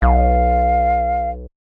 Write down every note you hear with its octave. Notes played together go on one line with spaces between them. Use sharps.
B1 F5